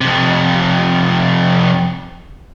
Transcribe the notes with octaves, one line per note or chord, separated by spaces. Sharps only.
F2 C3